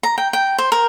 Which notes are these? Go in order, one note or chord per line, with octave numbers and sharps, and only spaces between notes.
A#5
G5
G5
C5
A#4